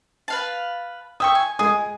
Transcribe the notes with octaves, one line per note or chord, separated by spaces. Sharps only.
B4 F5 A5
E5 G5 C#6 D#6
G#5
G#3 G#4 D#6